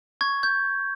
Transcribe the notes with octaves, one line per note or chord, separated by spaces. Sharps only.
C#6 G#6
G6